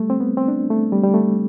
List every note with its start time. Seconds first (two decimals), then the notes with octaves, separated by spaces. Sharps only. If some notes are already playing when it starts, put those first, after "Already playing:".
Already playing: G3 A3
0.10 C4
0.20 B3
0.37 C4
0.48 D4
0.70 A3
0.92 G3
1.04 G3
1.14 A3